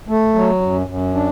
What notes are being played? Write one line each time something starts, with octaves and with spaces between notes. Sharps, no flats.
A3
F#3
F#2
F#2
D4